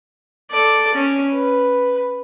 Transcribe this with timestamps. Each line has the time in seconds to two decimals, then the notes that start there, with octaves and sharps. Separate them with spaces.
0.51 A4 D5
0.94 C#4
1.31 B4